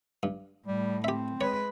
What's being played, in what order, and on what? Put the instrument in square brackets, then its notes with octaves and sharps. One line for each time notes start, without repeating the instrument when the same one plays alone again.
[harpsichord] G2
[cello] A2 [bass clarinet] G3
[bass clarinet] C4 [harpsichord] G4 E5
[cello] G#3 B4 [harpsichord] C#5